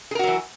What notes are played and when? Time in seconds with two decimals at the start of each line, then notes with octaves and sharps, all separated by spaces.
0.11 G#4
0.15 A#4
0.19 F#4
0.23 F#3
0.27 E3